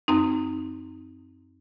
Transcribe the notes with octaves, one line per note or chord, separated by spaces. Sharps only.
F#2 C4 D#4